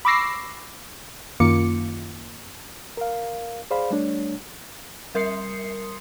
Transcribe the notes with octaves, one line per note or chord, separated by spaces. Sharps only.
B5 C#6 D6 E6 A#6 C7
F#2 D#3 A#3 F4 D6 C#7
A#4 F5
G#4 C5 D5 F5 B5
G3 A3 D4 C#5
G3 A#4 C6 D#6 C7 C#7